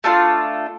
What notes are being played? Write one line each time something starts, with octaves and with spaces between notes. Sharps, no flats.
A3 D4 F4 A4